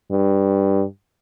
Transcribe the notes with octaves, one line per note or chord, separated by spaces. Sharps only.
G2